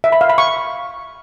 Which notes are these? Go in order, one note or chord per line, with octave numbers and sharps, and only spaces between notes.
E5
B5
F5
B5
C#6